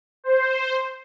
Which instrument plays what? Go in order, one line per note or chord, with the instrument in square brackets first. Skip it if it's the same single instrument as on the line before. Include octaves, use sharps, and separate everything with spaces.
[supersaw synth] C5